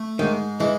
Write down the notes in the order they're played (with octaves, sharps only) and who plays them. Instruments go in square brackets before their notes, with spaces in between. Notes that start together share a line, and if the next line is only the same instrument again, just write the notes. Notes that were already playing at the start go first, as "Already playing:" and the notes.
Already playing: [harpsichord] A3
[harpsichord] G#2 [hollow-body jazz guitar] D#3
[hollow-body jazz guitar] E3 [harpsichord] G#3